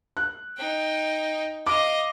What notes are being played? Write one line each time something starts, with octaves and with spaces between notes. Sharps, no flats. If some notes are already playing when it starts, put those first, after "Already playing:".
F#6
D#4 G5
D#5 F5 D6